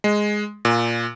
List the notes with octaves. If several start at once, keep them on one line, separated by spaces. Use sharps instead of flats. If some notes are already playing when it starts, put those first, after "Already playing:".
G#3
A#2